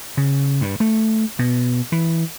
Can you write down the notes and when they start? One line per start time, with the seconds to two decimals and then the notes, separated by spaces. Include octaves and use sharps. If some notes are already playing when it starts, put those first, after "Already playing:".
0.17 C#3
0.61 G2
0.80 A3
1.39 B2
1.92 E3